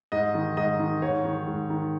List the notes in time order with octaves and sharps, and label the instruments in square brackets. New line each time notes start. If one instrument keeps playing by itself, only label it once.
[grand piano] G#2 D#5
D#3
G#2 D#5
D#3
G#2 C#5
D#3
G#2
D#3